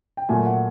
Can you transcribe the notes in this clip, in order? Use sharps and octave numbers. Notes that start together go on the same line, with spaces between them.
G5
A#2 F#3 A3 G#5
F#5